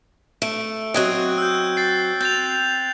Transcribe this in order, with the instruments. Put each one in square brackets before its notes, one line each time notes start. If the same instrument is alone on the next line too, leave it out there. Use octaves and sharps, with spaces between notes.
[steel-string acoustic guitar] A3 [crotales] D7
[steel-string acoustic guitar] F#3 C4 D#5 [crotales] F#6 G#6 D7
[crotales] E6 G6
A6 C7
[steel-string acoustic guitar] C4 [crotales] G6 A6 F7